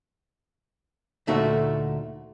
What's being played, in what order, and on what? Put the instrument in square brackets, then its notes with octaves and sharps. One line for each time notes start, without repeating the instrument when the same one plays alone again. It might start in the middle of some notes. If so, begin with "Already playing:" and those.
[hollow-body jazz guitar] D2 A#2 A3 D#4 F#4 E5